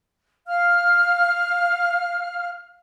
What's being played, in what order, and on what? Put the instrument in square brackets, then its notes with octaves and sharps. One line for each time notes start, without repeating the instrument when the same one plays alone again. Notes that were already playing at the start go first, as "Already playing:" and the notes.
[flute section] F5 F6